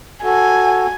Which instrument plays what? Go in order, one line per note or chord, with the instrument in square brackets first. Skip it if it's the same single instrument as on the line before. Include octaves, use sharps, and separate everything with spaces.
[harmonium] F#4 A4 [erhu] G#5